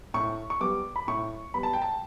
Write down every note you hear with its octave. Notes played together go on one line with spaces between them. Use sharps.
A2 C#6
C#6
G3 B3 D6
B5
A2 C#6
G3 B3 B5
A5
G5
A5